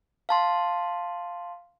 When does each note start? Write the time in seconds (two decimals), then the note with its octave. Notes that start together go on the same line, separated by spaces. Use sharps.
0.29 F5 A5 C6